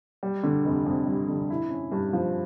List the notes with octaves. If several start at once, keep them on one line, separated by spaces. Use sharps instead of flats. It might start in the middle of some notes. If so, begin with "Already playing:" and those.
G3
D3
F1
F2
G3
D3
E4
C#4
G2
F3